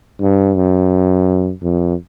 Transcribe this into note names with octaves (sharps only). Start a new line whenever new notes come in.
G2
F#2
F2